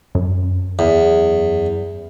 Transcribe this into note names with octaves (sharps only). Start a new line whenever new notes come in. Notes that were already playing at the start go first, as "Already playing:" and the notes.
F#2
E2